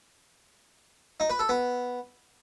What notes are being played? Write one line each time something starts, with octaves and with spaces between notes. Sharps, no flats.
D#4
B4
A4
B3